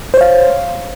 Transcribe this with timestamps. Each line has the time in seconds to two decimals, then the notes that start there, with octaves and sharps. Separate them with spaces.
0.14 C5
0.17 C#5
0.21 F5